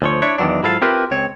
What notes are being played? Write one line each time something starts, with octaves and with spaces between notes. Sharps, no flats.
D2 F3 C#5
D4 E4 C#5
E2 D#3 E3 F#3 D4
G#2 F#3 E4 F4 A4 F5
C4 E4 F4 G4 A#4 B4
C#2 C4 C#5